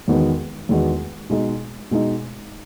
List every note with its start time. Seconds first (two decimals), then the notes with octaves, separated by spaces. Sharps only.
0.08 E2 D#3 G#3 B3 F#4
0.69 E2 D#3 G#3 B3 F#4
1.30 B2 G#3 D#4
1.91 B2 G#3 D#4